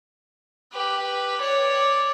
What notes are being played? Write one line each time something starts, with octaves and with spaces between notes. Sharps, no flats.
G4 B4
C#5 D5